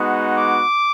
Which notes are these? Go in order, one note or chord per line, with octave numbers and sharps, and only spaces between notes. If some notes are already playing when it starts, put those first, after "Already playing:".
Already playing: G#3 B3 D#4 F#4
D6